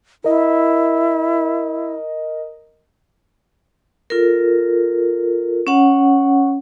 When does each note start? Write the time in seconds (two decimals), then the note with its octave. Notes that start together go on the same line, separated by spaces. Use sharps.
0.24 E4 A#4 D#5
4.10 F4 A4 A#4
5.67 C#4 C#5 F#5